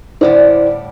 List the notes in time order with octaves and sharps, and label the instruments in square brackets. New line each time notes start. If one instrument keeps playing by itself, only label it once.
[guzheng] A2 D3 G3 [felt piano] E4 C5 D5